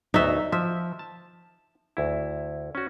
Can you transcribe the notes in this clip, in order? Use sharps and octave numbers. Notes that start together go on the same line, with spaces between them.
D2 F#3 B3 D#4 E5
F3 E5
A5
D2 E4
C#4 F#4